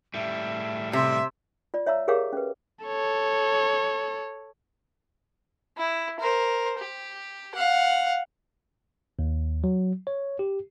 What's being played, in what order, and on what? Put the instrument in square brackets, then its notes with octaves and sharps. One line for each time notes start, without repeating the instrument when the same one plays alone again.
[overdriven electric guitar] A2 G3 [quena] E5
[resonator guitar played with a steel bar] C3 [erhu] E5 [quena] C6
[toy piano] F4 D5
C#5 E5 F5 A#5 E6
G4 G#4 A#4 C#5 F5 D6
C#4 B4
[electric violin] A4 C#5
[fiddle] E4
A#4 C5
G4
F5 F#5
[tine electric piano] D#2
F#3
C#5
G4